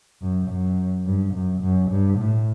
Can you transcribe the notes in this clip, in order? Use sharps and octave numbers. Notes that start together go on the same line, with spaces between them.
F#2
F#2
G2
F#2
F#2
G2
A2